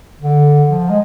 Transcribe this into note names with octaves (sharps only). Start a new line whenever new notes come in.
D3
F3
G#3